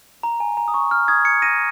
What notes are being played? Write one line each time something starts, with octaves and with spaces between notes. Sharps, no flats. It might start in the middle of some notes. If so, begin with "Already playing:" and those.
A#5
G#5
A#5
D#6
C#6
F6
D#6 G#6
G#6 C#7
A#6 D#7